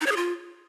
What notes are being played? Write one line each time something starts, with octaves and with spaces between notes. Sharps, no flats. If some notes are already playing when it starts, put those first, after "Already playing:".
D#4
C#5
G#4
F4